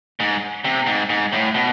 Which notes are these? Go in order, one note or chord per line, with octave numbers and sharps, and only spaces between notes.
G#2
C3
G#2
G#2
A2
B2